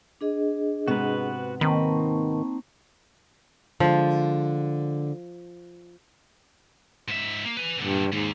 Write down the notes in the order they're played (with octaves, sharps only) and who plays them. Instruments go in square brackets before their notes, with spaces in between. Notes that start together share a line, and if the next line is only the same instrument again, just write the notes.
[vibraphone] D4 G#4 D#5
[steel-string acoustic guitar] G#2 C3 B3 [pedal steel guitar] F#4 B4
[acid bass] D#3 [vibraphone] A#3 A5 C#6 [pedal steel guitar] C4 D#4 B5
[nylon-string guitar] D3 G#3 [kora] F3
[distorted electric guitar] G#2 E5
A#3
B4 G#5
[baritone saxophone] G2 [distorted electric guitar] A#2 D3
[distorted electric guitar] D#2 [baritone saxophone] G#2